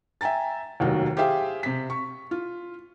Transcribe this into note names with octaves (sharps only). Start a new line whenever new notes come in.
E5 G5 G#5 A#5 A6
F1 D#2 D#3 F#3
G4 G#4 C5 E5 F5 G5
C3 B6
C#6
F4